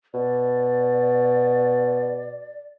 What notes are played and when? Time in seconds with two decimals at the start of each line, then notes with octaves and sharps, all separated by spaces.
0.14 B2 D5